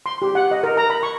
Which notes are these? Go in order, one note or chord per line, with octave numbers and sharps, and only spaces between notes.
C6
G4
F#5
D#5
A#4
A#5
B5
C#6